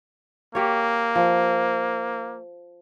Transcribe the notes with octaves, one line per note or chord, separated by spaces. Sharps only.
A#3 G4 C#5
F3